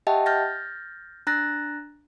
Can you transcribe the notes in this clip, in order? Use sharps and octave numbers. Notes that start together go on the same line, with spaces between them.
G4 D#5 E5 F#5 G5 A5
F6 G6 A6 A#6
D4 A#5 F#6 A6 A#6